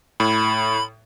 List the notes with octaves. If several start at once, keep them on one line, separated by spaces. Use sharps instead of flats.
A2 B5